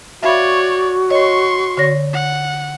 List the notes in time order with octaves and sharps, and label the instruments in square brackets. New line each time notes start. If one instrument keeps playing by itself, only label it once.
[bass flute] F#4 [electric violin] C#5 D5 [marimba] E5 F5 B5
[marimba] C#5 D#5 [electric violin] C6 C#6
[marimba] D3 C#5 A#6
[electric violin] F#5